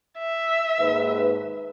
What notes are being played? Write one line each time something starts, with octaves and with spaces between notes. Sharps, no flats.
E5
D#2 G#2 B4